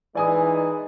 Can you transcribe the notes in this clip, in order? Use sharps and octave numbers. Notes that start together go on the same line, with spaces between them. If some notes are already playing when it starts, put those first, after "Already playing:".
E3 G#3 D#4 D5 G#5 D#6